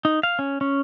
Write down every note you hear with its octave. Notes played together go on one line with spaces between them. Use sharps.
D#4
F5
C#4
C#4